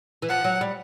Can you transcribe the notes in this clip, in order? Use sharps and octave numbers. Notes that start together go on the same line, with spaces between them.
E3
F3 F#5
F#3
G3